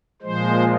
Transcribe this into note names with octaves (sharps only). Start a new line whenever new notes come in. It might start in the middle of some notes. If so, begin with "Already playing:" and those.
A#2 F3 G#3 C5